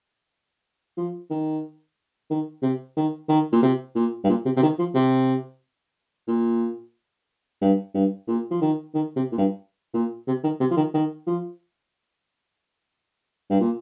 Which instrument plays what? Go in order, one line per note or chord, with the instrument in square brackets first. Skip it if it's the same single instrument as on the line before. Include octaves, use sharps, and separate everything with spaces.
[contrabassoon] F3
D#3
D#3
C3
D#3
D#3
A#2
C3
A#2
G2
A#2
C3
C3
D#3
F3
C3
A#2
G2
G2
A#2
F3
D#3
D#3
C3
A#2
G2
A#2
C3
D#3
C3
F3
D#3
D#3
F3
G2
A#2